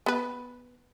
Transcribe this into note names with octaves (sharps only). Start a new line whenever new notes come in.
B3 B4